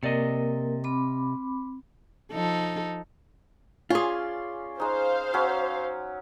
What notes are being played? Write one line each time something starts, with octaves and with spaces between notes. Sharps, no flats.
C3 A#3 A#4 D5 D#5
C4 B5 D6
F3 D#4 A4
C#4 F4 G#4 D5 C6
G#3 D#4 C5 F5
F#3 C#4